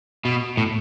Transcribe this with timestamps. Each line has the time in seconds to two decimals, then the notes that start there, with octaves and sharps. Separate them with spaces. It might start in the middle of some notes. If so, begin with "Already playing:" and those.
0.25 B2
0.57 A2